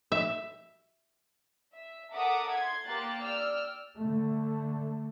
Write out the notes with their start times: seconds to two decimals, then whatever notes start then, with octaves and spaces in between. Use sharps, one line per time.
0.12 E5
1.74 E5
2.12 A4 A#4 E5 F#5 D6 D#6
2.53 C6 G#6
2.86 A#3 G4 A#4 C6 F#6 A6
3.22 D5 G5 E6 F6
3.99 D3 A3